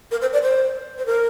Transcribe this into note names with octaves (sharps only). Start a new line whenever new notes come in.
A#4
C5
D5
C5
C5
A#4